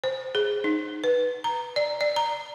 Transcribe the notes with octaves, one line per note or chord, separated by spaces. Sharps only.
C5
G#4
D#4
B4
A#5
D5
D5
A#5